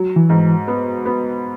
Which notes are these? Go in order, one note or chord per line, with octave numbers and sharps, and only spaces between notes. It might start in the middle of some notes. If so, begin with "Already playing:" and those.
Already playing: F#3
E3
G#2
B3
B3